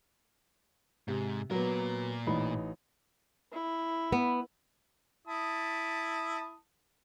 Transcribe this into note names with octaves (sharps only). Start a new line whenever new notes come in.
G#2 C3
A#2 F#3 B3 A#4
A1 D#4 B5
E4
B3
E4 A5 D#6